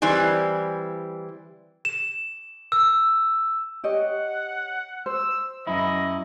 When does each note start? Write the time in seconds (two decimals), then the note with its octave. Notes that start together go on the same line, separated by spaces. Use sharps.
0.02 E3 G3 C4 G#5
1.85 E7
2.72 E6
3.84 G4 C#5 D#5 F#5
5.06 C5 E6
5.67 F#2 E4 D#5